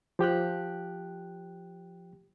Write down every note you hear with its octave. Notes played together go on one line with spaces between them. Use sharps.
F3 G4 G5 F#6